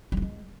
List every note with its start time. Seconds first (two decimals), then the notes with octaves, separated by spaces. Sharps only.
0.12 G3
0.17 F#3
0.22 G#3